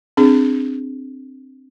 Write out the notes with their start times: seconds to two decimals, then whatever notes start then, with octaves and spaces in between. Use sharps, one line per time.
0.17 C4 D4 G#4